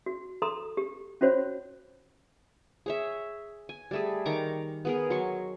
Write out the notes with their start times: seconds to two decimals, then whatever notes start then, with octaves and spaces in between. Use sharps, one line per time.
0.06 F#4
0.42 A4 A#5 C6 D#6
0.77 G4
1.21 C#4 F4 F#4 C5 C#5
2.86 G#4 C#5 E5
3.69 G#5
3.91 G3 A3 G#4
4.25 D#3 A#5 C#6 D6
4.85 B3 G#4 A#4
5.10 F#3 C6 C#6